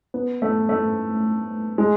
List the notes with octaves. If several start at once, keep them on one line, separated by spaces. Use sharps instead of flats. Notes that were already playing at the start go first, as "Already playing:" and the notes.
B3
A3
A3
G#3